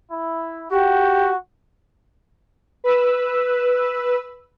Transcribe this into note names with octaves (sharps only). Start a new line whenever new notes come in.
E4
F#4 G4
B4 E6